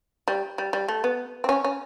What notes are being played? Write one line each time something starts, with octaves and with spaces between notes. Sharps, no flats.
G3
G3
G3
A3
B3
C4
C#4
C#4